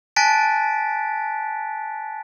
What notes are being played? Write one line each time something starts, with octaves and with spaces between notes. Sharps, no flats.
G#5 A5 F#6 A6 B6 D7